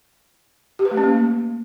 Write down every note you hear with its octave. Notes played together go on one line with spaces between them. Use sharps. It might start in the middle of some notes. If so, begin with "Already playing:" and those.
G4
B4
A3
C#4
A#3